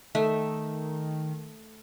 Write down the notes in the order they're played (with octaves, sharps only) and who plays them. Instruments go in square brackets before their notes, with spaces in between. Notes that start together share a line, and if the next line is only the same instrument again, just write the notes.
[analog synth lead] D#3 [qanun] A3 E5